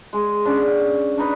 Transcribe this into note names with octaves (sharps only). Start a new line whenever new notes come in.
G#3
C#4 D4 F#5
D4 D#4 B4